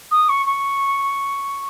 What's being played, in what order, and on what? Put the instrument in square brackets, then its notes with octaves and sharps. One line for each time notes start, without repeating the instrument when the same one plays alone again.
[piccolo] D#6
C#6
C#6